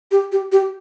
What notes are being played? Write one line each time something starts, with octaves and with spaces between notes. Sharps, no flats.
G4
G4
G4